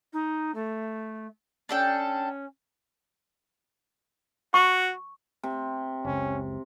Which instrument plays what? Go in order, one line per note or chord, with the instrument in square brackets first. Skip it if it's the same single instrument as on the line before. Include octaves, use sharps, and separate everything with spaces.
[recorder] D#4
A3
[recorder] C#4 [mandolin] D4 A4 G5
[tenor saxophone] F#4 [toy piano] C#6
[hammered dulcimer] C3
[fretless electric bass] F#1 C#2 [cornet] C#4